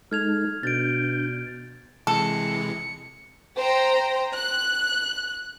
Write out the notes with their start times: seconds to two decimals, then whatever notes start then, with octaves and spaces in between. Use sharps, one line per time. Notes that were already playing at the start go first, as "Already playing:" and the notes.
0.11 G#3 D#4 A4 F6 G#6 F7
0.63 B2 D4 G6 A6 D7
2.07 C3 E3 G#3 A4 C#7
3.56 C5 G5 A#5
4.35 F#6